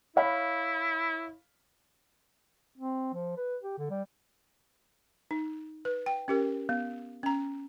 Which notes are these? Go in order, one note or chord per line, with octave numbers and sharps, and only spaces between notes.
E4 C#5 F5 B5
C4
F3
B4
G4
D3
G3
D#4
B4
G5
C#4 G4 A#4
B3
C#4 A#5